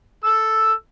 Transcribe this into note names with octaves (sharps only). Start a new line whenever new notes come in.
A4 E6